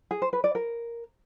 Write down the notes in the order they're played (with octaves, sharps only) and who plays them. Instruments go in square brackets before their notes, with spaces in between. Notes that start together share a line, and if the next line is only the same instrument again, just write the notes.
[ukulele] G#4
C5
B4
D5
A#4